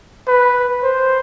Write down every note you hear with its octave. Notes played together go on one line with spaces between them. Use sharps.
B4
C5